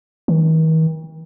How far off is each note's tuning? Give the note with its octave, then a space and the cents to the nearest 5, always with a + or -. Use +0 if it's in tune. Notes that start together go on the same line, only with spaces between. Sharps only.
D#3 +45